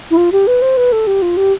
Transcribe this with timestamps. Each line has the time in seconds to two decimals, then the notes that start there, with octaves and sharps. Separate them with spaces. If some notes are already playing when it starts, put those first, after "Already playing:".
0.11 E4
0.17 F4
0.32 G4
0.47 B4
0.62 C5
0.77 B4
0.92 A4
1.07 G4
1.22 F4
1.37 G4